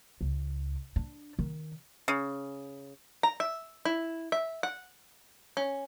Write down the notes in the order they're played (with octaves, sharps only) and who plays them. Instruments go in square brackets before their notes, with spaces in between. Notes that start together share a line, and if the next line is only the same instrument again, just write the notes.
[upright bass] C#2
D4
D#3
[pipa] C#3
[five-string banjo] A#5
E5
E4
E5
F#5
C#4